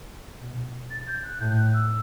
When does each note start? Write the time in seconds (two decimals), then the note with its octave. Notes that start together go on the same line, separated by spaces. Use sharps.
0.41 B2
0.90 A6
1.07 G6
1.23 F#6
1.39 A2 G6
1.56 F#6
1.73 E6